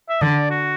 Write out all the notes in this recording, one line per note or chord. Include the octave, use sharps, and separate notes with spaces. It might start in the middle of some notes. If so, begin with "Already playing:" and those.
E5
D3 D5
F#4